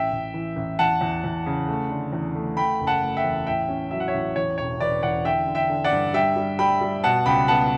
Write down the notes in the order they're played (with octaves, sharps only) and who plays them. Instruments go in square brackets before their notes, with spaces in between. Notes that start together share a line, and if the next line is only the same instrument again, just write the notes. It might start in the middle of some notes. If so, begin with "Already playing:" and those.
Already playing: [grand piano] A1 E5 G5
A1
E3
A1
E2 F#5 A5
E2
E2
C#3
A3
D3
E2
A3
A3 G5 B5
F#1
F#5 A5
A3
E5 G5
E2
A2 E5 G5
C#4
F#3 E5
F#5
C#5 E5
A1
E2 C#5
E1 C#5
E1 B4 D5
E2 D5 F#5
D3 E5 G5
D3
E5 G5
D3
D5 F#5
G2
G3 E5 G5
G3
G3 G5 B5
G3
B2 F#5 A5
C#2 G5 B5
B3 F#5 A5